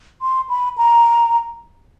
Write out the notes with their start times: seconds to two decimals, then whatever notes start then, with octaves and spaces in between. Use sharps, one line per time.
0.22 C6
0.49 B5
0.78 A#5